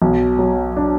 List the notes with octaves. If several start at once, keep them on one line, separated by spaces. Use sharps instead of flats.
B1
F#3
D4